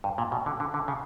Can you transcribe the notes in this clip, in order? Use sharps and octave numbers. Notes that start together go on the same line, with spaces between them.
G2
A#2
B2
D3
D3
D3
C#3